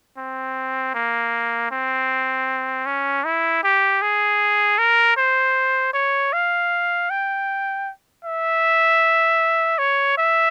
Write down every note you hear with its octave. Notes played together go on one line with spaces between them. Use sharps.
C4
A#3
C4
C#4
E4
G4
G#4
A#4
C5
C#5
F5
G5
E5
C#5
E5